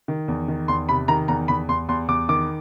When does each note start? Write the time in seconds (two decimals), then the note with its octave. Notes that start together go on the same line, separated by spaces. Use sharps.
0.08 D#3
0.28 E2
0.48 D#3
0.68 E2 C6
0.89 C3 B5
1.08 D#3 A#5
1.28 E2 A#5
1.48 E2 B5
1.68 E2 C6
1.89 E2 C6
2.08 E2 D6
2.29 D#3 D6